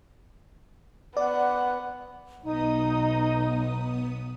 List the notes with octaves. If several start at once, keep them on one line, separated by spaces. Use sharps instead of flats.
B3 D5 F#5
B1 B3 D#4 D#6